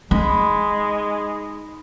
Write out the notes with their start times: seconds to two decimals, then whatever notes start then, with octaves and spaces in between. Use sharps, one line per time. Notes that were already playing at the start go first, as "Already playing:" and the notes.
0.11 G#3 D#4 B5